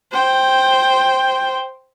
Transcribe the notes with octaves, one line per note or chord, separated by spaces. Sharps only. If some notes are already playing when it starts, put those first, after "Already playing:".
C5 G5